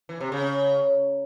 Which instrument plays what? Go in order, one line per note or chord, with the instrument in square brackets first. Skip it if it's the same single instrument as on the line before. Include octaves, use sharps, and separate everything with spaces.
[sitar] E3
C3
C#3